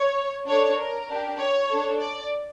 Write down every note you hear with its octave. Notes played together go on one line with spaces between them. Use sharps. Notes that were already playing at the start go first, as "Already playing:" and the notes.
Already playing: C#5
D4 A4 C#5
A#4
D4 G4
C#5
D4 A4
D5